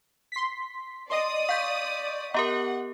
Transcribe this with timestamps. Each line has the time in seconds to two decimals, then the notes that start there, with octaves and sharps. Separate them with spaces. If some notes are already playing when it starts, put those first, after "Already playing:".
0.32 C6 B6
1.10 D5 D#5 C6 D#6
1.49 F5 C#6 G6 B6
2.34 B3 G4 A#4 D#5 F#5 A#5 D6